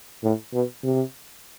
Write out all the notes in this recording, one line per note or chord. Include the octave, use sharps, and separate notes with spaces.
A2
B2
C3